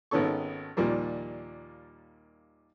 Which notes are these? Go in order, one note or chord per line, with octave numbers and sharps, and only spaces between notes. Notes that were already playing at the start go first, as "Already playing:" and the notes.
G#1 D#3 B3 C#4 A4 C#6
D#2 A#2 F3 G3 A#3